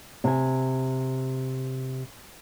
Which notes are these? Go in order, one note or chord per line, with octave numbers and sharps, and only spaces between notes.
C3 G#5